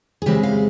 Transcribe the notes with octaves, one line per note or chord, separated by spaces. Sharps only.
G#4
C#3 E3 G#3 C4 G4
F5